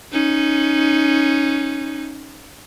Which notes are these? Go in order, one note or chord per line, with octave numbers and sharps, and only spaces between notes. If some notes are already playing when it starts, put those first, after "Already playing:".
C#4 D#4